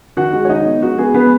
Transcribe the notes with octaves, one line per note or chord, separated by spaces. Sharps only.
D#3 F#4 F#5
G#3
C#5
G#3 D#4 D#5
B3
G#3 F#4
B3 G#4
G#3 B3 B4